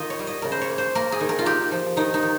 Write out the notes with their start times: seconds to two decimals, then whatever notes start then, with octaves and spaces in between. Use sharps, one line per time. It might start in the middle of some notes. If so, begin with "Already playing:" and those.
Already playing: D#3 F4 D#5
0.10 C#5
0.19 G3
0.27 D#5
0.42 C#3 A#4
0.52 C5
0.61 C#5
0.70 A#3
0.78 C5
0.95 A#3 A#4
1.12 G#4
1.20 D#3
1.29 A#4
1.39 F4
1.46 D#4 G4
1.72 F3
1.96 D#3 D#4
2.14 D#4
2.22 D#3